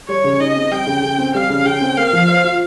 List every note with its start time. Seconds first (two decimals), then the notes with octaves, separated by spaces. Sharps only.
0.08 G3 C#5
0.24 C#3
0.40 D#4 D#5
0.56 C4
0.71 G3 G5
0.87 C#3
1.03 C#3
1.18 C4
1.35 G3 F5
1.50 C#3
1.66 C#3 G5
1.81 C4
1.97 A#3 F5
2.13 F3
2.28 C5
2.44 F4